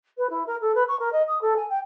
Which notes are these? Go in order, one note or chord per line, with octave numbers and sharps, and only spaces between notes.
B4
E4
A#4
A4
B4
C#6
A#4
D#5
D#6
A4
G#5
G5